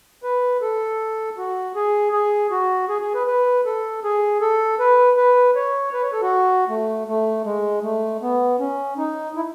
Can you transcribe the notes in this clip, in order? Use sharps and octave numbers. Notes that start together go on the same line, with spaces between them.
B4
A4
F#4
G#4
G#4
F#4
G#4
G#4
B4
B4
A4
G#4
A4
B4
B4
C#5
B4
C#5
A4
F#4
A3
A3
G#3
A3
B3
C#4
D#4
E4